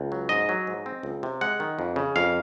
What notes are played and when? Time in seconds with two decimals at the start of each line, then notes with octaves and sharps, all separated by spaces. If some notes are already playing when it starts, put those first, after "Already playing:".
Already playing: C#2
0.12 F#3
0.29 G#2 D#5
0.49 F#3
0.67 G#2
0.86 C4
1.03 C#2
1.23 C3
1.41 G#3 F#5
1.60 D#3
1.79 F2
1.96 C#3
2.16 F2 F5